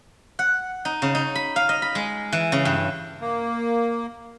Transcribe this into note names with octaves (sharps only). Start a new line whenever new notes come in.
F#5
D#4
C#3
D#4
B5
F5
D#5
B5
G#3
E3
C#3
G2
A#3